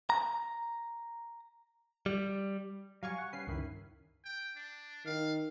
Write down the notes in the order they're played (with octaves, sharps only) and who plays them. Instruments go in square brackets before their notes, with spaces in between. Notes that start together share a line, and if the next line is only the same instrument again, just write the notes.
[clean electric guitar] A#5
G3
[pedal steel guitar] F#3 G3 [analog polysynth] F5 G#5 C#6
[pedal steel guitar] F#5
[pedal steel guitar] G3 C#4 B4 [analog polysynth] C7
[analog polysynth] C#2 G2 D#3 [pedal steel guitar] C#4 E4 B4
[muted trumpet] G5
D4
[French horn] D#3 [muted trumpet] F5